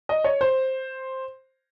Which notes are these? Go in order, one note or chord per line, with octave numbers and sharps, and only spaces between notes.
D#5
C#5
C5